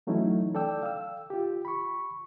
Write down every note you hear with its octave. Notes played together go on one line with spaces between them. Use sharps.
E3 F#3 A3 C#4 D#4 E4
A4 D5 G5 E6
F5 E6
F4 G4
B5 C#6